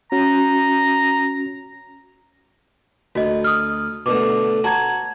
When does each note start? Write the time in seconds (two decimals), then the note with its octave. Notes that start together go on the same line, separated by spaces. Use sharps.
0.12 C#4 F#4 A#5
3.15 D2 F#4 D#5
3.44 D#6 F6
4.06 B2 D3 A3 D6
4.64 F#4 C#5 A5 A#5 G#6